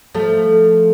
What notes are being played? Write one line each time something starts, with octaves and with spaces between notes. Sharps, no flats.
F3 A3